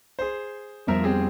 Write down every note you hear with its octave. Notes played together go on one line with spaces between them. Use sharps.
G#4 C5
F2 F3 G3 B3 A#4 E5
C4 G4 G#4